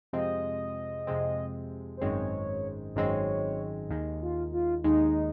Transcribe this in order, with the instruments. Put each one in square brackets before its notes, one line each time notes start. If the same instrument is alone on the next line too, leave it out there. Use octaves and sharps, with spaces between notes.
[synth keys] F2 C3 F3 G#3 C4 [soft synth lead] D#5
[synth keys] F2 C3 F3 G#3 C4
[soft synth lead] C5
[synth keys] G#1 F#2 D#3 G#3 C4 [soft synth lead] C#5
[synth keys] G#1 F#2 D#3 G#3 C4 [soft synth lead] C#5
[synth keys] D#2 D#3 G#3
[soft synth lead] F4
F4
[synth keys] D#2 D#3 G#3 [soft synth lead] D#4